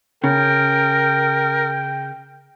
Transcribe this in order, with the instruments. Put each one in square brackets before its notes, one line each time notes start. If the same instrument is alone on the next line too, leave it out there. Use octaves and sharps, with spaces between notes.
[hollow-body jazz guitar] C#3 [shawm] A#4 [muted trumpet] G5